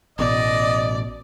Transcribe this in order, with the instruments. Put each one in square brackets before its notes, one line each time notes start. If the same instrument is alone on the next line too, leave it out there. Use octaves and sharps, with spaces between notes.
[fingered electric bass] A1 B2 [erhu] D5 [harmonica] D#5